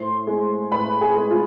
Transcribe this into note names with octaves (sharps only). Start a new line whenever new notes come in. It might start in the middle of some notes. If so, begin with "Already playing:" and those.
Already playing: A2 C5 C6
G#3
A2 B4 B5
G#4 G#5
G#3
F4